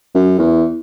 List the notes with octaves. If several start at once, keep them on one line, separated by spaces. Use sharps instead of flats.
F#2
E2